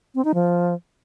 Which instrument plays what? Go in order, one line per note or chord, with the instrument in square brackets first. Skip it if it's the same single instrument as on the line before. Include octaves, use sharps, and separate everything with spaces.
[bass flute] C4
D#4
F3